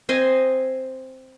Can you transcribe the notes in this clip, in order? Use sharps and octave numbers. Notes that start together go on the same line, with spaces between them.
C4 C5 D#5 G#5